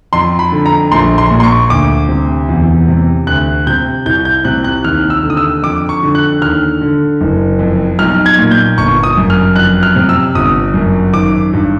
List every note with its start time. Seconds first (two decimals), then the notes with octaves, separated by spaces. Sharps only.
0.13 F2 C6
0.39 B5
0.52 D3
0.66 A#5
0.92 A#1 C6
1.18 C6
1.31 A#2
1.40 C6
1.43 C#6
1.70 D2 D6
2.09 C3
2.49 E2
2.88 C3
3.27 D2 F#6
3.67 C3 G6
4.06 C2 G6
4.25 G6
4.44 C3 F#6
4.64 F#6
4.84 D#2 F6
5.10 E6
5.23 D3
5.30 D#6
5.37 E6
5.63 F2 D6
5.89 C#6
6.03 D3
6.15 F#6
6.41 D#2 F6
6.82 D3
7.21 F#1
7.59 F2
7.99 B1 F6
8.26 G#6
8.39 A#2
8.51 G6
8.78 G1 C#6
9.03 D#6
9.17 F#2
9.30 F6
9.56 F2 F#6
9.83 F6
9.96 C3
10.09 E6
10.35 G1 D#6
10.74 F#2
11.13 G#1 D6
11.53 G2